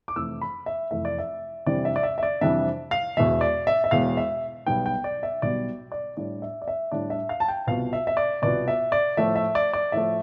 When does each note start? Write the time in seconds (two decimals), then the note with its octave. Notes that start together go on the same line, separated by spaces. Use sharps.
0.08 D6
0.16 F1 F2 E3 A3 E4 E6
0.41 B5
0.66 E5
0.91 F1 F2 E3 A3 E4 E5
1.05 D5
1.19 E5
1.66 F2 C3 E3 G3 D4 D5
1.85 E5
1.96 D5
2.03 E5
2.18 E5
2.23 D5
2.41 F2 C3 E3 G3 D4 E5
2.91 F5
3.17 E1 E2 B2 E5
3.41 D5
3.67 E5
3.84 E5
3.91 E1 E2 B2 F5
4.17 E5
4.66 B1 B2 G3 B3 G5
4.86 G5
5.04 D5
5.23 E5
5.42 B1 B2 G3 B3 D5
5.92 D5
6.17 A2 G3 D4 D5
6.42 E5
6.62 D5
6.68 E5
6.92 A2 G3 D4 D5
7.10 E5
7.29 F5
7.40 A5
7.48 G5
7.67 C2 B2 B3 F4 F5
7.93 E5
8.07 E5
8.17 D5
8.42 C2 B2 B3 F4 D5
8.68 E5
8.92 D5
9.17 A2 F3 A3 E5
9.36 E5
9.55 D5
9.73 D5
9.92 A2 F3 A3 E5